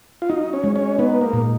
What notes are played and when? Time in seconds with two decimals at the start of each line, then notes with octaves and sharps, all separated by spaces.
0.22 F4
0.29 D#4 F#4
0.53 C#4
0.64 G#3
0.76 C#4
0.99 B3 D#4
1.21 A#3
1.33 A#2